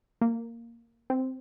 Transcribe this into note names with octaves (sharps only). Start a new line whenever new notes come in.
A#3
C4